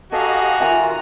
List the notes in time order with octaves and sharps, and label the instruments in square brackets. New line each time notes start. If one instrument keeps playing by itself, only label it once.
[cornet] F#4 [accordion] G4 D#5 F5 [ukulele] A4 [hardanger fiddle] G#5 A#5
[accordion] D#3 F4 [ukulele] E5 G#5 [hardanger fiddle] A#5